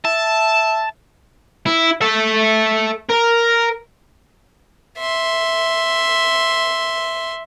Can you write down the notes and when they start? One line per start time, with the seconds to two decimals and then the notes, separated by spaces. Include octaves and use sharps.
0.05 E5 A5
1.66 E4
2.01 A4 E5
3.09 A#4
4.98 E5 C6